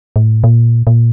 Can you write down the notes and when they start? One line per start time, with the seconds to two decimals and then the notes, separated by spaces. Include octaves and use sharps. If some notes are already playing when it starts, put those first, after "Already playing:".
0.16 A2
0.44 A#2
0.87 A#2